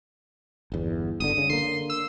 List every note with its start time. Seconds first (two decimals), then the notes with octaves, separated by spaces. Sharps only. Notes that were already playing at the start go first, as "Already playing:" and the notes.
0.72 G1 E2
1.20 G1 D3 D#6
1.38 C#3
1.50 D3 A#3 C6
1.90 E6